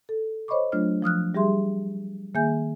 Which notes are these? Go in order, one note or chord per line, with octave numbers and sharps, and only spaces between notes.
A4
C5 C#5 D#5 B5 C#6 D6
F#3 A3 D4 F4 F6
F3 D#6 F6 F#6
G3 G4 G#4 E5 C6
D#3 A#3 G#4 E5 G#5 G6